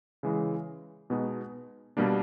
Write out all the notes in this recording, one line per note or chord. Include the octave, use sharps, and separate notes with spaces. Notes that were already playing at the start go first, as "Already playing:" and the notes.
C#3 E3 G#3
B2 G#3 B3 D#4 F#4
B2 G3 A#3 D4